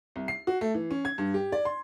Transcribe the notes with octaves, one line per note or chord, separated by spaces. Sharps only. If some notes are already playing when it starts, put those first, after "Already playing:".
C2
C7
F#4
A3
E3
C#4
G#6
G2
G4
D5
C6